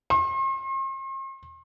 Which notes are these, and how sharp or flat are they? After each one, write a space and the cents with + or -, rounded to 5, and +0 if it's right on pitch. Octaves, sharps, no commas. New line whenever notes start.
C6 +45